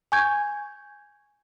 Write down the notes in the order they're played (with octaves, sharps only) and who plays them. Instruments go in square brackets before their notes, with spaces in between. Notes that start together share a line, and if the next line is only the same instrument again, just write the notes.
[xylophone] G#5 C#6 G6 G#6